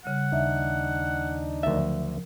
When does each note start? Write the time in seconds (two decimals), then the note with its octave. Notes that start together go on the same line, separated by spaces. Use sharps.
0.05 C#3 G3 F#5
0.32 D#2 D4 D#4 E5
1.63 D2 F3 F#3 A#4 E5